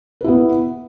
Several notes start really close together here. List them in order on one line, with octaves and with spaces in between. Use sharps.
B4 E4 B3